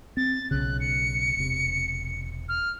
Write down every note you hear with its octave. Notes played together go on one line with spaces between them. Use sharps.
C4 A6
B1 C#3 F#6
C#7
E1 C3
F6